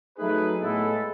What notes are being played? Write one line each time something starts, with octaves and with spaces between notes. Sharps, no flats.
F#3 A3 D#4 G#4 B4
A2 G#3 B3 E4 A4